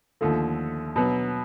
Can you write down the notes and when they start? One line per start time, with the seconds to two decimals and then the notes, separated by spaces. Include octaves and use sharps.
0.21 D#2 D3 F3 A3
0.96 B2 F#3 B3